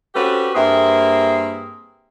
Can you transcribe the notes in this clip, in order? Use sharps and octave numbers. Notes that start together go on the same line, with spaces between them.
C4 C#4 F#4 G4 A4 B4
G2 A#3 C4 G#4 E5